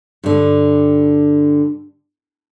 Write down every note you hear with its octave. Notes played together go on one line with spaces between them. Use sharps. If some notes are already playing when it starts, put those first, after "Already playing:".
G2 D3